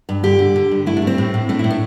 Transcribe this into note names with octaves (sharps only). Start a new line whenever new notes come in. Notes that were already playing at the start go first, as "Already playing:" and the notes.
G2
D3 G4
D3
D3
G2
A3 E4
D4
A3
C4
A2
A2
A3 D4
E4
A2
D4